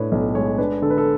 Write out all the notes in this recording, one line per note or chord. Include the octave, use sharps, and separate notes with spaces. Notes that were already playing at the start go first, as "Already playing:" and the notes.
Already playing: A2 D4 B4 C#5
B1
G#3 C#5
D4 B4
D3 A4
B4
A4